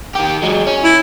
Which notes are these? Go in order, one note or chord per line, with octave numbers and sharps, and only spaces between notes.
D#3 G4
F#3 G#3
C#4
E4